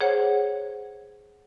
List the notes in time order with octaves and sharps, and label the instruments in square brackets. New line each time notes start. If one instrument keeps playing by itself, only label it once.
[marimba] G#4 C5 C#5 F#5